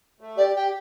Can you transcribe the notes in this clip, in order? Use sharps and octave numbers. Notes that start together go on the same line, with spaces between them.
A3
G4 D5
G4 G5